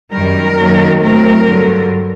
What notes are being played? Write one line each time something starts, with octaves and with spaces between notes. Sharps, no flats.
F#2 D#3 G3 A#4
F#2 D#3 F#3 A#3
A2 F#3 C4 A#4
G2 D3 F#3